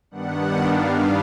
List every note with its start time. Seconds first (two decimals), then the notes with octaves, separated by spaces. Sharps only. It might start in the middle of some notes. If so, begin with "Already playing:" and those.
0.11 G2 D#3 G3 B3 D4 F#5
0.63 F5